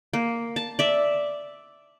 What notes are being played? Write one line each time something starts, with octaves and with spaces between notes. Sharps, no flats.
A#3
A5
D5 E5